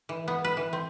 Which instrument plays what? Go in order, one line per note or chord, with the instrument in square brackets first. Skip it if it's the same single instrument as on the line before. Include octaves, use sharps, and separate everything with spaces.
[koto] E3
B3
B4
E3
C4